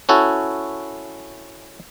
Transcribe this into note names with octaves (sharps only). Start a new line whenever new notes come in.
C#4 E4 F#4 A4